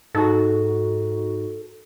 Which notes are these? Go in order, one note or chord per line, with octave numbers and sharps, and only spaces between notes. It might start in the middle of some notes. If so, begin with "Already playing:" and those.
G#2 D#4 F#4 A4